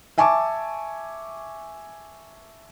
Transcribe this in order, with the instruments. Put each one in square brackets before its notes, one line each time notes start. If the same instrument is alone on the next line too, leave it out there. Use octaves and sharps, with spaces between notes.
[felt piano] E5 G#5 A5 C#6 D6